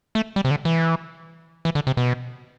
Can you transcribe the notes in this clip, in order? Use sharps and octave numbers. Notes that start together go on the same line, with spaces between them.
A3
G3
C3
D3
E3
E3
D3
C3
B2